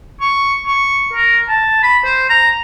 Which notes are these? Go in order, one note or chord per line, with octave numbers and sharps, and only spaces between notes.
C#6
C#6
A#4
A5
B5
C5
A#5